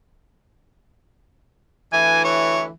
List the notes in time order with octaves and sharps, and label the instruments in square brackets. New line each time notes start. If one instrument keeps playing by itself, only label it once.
[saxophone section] D2 E3 [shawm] G#5
[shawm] C#5